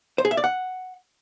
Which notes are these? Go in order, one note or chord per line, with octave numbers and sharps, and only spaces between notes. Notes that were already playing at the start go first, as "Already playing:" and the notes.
C5
G#4
E5
D5
F#5